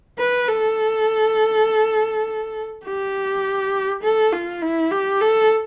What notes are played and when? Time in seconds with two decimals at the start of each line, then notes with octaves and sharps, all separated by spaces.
0.19 B4
0.48 A4
2.85 G4
4.03 A4
4.33 F4
4.62 E4
4.91 G4
5.21 A4